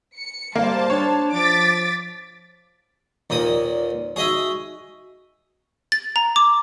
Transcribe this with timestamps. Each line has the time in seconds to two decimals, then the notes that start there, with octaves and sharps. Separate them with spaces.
0.18 C#7
0.55 G3 A#3 C5 A5
0.90 D4 C#5
1.34 F3 D6 A6 B6
3.30 D#2 A#2 A#4 B4 D5 D#6
4.16 D#4 F#4 G#4 D#5 E5 C#6
5.92 A6
6.16 A#5
6.36 D6